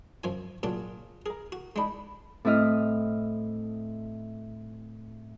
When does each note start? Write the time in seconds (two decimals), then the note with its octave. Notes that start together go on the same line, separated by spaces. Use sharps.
0.24 F#2 F3 G#5
0.63 A#2 F#3 D4 F4 G#4
1.26 G#4 A#4 A#5
1.52 F#4
1.76 G#3 D4 D#4 G#4 B5
2.45 A2 C4 E4 D#5 F6